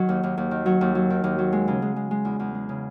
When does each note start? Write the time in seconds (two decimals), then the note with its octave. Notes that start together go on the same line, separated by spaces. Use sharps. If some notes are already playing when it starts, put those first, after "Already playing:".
Already playing: D#3 F#3
0.09 D#2
0.23 D#2
0.37 D#2
0.51 D#3
0.66 F#3
0.81 D#2
0.95 F#3
1.10 D#3
1.24 D#2
1.38 F#3
1.52 G#3
1.68 C#3
1.82 G#3
1.96 G#3
2.11 G#3
2.25 E2
2.39 E2
2.55 G#3
2.69 C#3